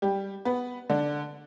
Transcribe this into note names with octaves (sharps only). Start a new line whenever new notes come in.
G3 G4
B3 B4
D3 D4